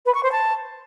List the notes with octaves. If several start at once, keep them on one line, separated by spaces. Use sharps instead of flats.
B4
C#6
C5
A5